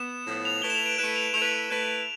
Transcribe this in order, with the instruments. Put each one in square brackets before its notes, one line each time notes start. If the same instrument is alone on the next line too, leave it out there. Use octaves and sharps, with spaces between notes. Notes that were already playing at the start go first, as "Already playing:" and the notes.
Already playing: [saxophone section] B3 [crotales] E7
[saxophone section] A2 F3 B3
[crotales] F7
[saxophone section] A3 E4 B4 [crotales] G7
[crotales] E7
F7
D7
[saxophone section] A3 E4 B4 [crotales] E7
[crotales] F7
[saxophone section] A3 E4 B4 [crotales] F7
[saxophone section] A3 E4 B4